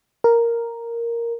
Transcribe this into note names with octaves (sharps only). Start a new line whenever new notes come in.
A#4